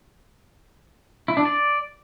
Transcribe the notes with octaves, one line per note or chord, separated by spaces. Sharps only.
E4
D4
D5